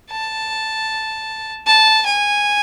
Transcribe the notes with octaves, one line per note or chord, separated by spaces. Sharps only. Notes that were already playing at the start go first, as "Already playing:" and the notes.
A5
A5
G#5